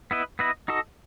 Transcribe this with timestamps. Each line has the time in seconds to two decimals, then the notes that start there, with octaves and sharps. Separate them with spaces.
0.11 B3 E4 B4 D#5
0.39 B3 E4 B4 D#5
0.68 D#4 F#4 A4 D#5